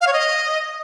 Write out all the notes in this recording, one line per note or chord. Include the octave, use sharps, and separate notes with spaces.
F5
C#5
D#5